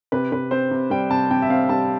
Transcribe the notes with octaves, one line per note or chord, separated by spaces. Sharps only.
C3 B4
C3 B4
C4 C5
C3
G3 G5
C3 A5
C3 G5
E5
C4 F5
G3 A5